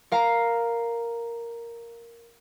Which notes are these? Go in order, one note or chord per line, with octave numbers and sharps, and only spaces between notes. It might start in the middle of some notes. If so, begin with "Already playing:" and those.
A#4 F5 A#5